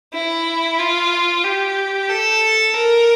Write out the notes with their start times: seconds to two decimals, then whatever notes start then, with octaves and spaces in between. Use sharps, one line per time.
0.14 E4
0.79 F4
1.44 G4
2.10 A4
2.74 A#4